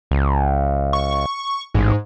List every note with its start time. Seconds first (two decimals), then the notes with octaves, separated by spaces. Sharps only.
0.11 C#2
0.93 C#6
1.74 A1 G#2